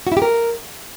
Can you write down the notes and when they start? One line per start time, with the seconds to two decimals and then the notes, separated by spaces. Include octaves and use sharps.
0.07 F#4
0.12 E4
0.17 G4
0.22 A#4